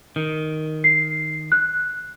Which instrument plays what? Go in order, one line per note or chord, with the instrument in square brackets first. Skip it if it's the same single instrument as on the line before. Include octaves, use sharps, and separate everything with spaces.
[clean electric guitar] D#3
[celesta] C7
F#6